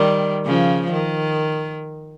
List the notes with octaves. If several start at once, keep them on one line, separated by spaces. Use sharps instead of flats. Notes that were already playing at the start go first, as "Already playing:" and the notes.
Already playing: D#3 G3
C#3 F3
D#3